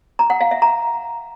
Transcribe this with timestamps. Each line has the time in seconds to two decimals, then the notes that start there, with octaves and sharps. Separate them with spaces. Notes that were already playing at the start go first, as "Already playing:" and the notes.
0.19 A#5
0.30 F#5
0.41 F5
0.51 E5
0.62 A#5